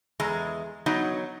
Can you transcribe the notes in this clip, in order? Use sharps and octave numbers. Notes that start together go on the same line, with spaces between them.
E2 G#3 A#5
F#3 B3 D#4 D#5